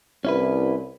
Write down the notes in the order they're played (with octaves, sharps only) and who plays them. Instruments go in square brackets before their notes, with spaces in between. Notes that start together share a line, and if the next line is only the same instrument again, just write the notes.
[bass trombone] C2 [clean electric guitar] C#4 E4 B4